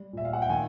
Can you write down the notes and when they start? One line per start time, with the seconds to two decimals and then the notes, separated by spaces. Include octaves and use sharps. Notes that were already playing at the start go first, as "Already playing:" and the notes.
Already playing: G3
0.13 A#2 E5
0.25 F5
0.33 F#5
0.42 G5
0.50 D#3 G#5